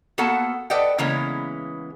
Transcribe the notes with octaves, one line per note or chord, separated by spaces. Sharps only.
A#3 B3 F#4 A4 F#5 A5
A4 B4 D5 D#5 F#5 G5
C#3 E3 G#3 A#3 B3 C#4